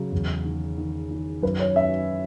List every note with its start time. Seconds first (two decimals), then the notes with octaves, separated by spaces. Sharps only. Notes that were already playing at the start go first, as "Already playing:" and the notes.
Already playing: C#3 F#3
0.12 E2
0.45 D#3
0.78 D#3
1.11 D#3
1.43 F#2 B4
1.60 C#5
1.76 C#4 E5